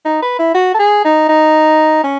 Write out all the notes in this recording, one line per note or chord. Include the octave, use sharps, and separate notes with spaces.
D#4
B4
E4
F#4
A4
G#4
D#4
D#4
C#4